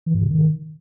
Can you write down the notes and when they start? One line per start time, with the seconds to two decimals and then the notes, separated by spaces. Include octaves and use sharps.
0.06 E3
0.14 G#2
0.23 C3
0.31 D#3